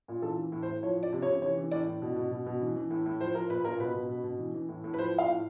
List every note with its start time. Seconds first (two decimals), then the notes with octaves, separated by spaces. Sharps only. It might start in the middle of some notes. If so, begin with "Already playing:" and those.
0.08 A#2
0.22 E3 A4
0.37 E3
0.52 A2
0.62 C5
0.67 A2
0.83 F3 C#5
0.97 F3
1.03 D5
1.13 C3
1.22 C#5
1.27 C3
1.42 E3 C#5
1.57 E3
1.71 A2 D5
1.86 A2
2.02 B2
2.16 B2
2.31 B2
2.46 B2
2.61 E3
2.76 E3
2.90 A2
3.06 A2
3.20 F3 C5
3.35 F3 A#4
3.50 A#2 B4
3.64 A#2 A#4
3.80 B2 B4
3.95 B2
4.09 B2
4.24 B2
4.39 E3
4.54 E3
4.69 A2
4.84 A2
4.94 B4
4.98 F3 C5
5.13 F3
5.18 F5
5.28 A2